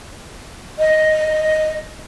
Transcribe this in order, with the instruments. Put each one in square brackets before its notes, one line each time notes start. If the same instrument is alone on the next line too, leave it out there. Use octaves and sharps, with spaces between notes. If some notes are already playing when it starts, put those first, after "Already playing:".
[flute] D#5